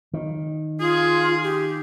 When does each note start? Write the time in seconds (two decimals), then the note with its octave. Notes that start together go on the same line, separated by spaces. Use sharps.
0.13 D#3
0.80 F4 G#4
1.43 G4